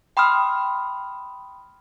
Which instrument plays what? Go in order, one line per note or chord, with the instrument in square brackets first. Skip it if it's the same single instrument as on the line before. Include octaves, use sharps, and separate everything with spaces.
[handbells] G5 B5 C6 D#6 F6